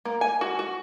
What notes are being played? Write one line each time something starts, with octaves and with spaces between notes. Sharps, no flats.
A#3
G#5
F#4
F#4